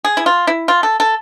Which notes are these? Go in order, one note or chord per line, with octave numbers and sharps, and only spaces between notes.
G#4
E4
F4
E4
F4
A4
A4